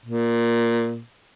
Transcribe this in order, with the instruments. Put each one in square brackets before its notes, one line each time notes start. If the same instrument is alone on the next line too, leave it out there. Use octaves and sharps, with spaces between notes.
[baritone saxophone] A#2